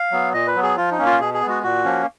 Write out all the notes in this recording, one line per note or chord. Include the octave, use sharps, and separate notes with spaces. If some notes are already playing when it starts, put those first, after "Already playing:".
Already playing: F5
F#3 B3
A#2 D#5
B4
F#3 B3
G#4
F3 F4
D#4
A#3 C#4
F4
B2 G#4
G#4
B3
G#3 F#4
A#2 F#4
F3 A#3 C#4